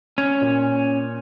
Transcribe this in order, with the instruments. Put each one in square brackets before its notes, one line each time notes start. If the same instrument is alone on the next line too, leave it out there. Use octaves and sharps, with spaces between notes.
[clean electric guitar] C#4 [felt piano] G#6
[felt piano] A#2